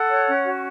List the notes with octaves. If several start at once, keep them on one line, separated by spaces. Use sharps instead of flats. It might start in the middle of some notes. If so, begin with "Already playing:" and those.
Already playing: A4 F#5
C#5
C#4
F#4